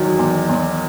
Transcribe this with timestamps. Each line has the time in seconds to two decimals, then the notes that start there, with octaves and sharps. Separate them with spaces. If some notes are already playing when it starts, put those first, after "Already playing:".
Already playing: E2 D#3 F#3
0.19 E2
0.49 E2